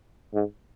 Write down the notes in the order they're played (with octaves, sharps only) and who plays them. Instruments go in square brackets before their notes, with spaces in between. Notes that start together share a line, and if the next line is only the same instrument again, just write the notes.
[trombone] G#2